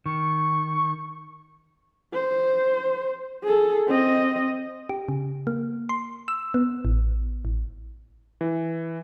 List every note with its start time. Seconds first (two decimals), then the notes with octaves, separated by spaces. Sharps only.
0.06 D#3 C#6
2.13 C5
3.44 G#4 A4
3.88 C4 D#5
4.89 G4
5.09 C#3
5.47 A#3
5.89 C6
6.28 E6
6.54 B3
6.85 A1
7.45 A1
8.41 E3